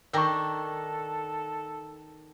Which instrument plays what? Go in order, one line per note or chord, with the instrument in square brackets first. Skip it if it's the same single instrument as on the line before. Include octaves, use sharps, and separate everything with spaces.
[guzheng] D#3 [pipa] D4 G5 A#5 [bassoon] A4 [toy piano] A#4 C#6